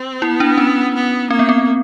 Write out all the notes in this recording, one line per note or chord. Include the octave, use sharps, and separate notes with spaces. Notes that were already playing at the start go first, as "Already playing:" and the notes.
Already playing: C4
B3 E4
D4
C#4
B3
A#3 C4
B3
C4